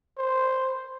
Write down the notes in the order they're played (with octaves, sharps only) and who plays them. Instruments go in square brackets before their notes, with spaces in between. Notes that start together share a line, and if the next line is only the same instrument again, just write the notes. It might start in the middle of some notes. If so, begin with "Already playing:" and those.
[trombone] C5